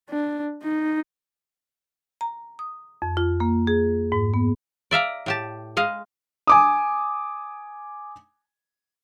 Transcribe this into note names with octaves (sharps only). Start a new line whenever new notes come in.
D4
D#4
A#5
D#6
F2
F4
A#3
G#4
G#2
B3
D5 E5 F5 A#5
A2 G4 A5
G#3 D#5 F5
G#5 D6 D#6